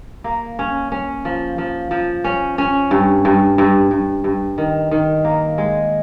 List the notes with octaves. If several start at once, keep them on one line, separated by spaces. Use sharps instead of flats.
A#3
C#4
C#4
F3
F3
F3
C#4
C#4
G2
G2
G2
G2
G2
D#3
D#3
A#3
G#3